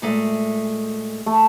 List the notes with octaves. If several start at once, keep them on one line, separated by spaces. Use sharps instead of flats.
A#2 G#3 A3
A3